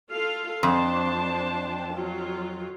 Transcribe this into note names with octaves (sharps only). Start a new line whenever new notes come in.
F4 A4 F5
F2 D4 C5 A5
F#3 F4